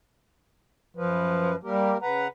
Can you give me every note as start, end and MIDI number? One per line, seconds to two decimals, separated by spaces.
0.97 1.56 42
0.97 1.56 53
0.97 1.56 71
1.64 1.95 55
1.64 1.97 58
1.64 1.97 67
1.64 1.97 70
2.02 2.28 49
2.02 2.27 71
2.02 2.28 78
2.02 2.28 82